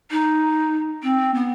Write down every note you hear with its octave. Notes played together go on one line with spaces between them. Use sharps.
D#4
C4
B3